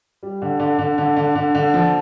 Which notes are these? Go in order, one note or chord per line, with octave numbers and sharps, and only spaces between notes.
G3
D3
D3
D3
D3
D3
D3
D3
F3